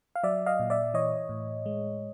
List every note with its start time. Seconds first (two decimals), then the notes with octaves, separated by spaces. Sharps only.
0.16 F5
0.23 F#3 D5 E5
0.46 D#5 F5
0.59 A#2
0.70 D5 E5
0.94 E3 C#5 D#5
1.29 A2
1.66 G#3